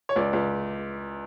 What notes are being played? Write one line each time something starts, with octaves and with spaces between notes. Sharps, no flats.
C#5
C#2 D5
C#2